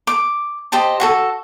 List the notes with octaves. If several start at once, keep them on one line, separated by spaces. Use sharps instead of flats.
D6
G4 C5 D#5 A5
F#4 G#4 A4